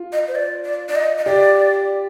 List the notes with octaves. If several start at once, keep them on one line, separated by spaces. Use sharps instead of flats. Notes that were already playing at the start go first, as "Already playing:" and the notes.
Already playing: F4
D#5
C5
D5
D5
D5
D#5
D#5
G4 D5